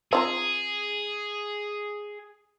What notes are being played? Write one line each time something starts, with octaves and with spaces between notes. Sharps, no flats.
C4 F4 G#4 A#5